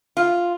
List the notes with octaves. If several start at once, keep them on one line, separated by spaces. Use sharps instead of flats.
F4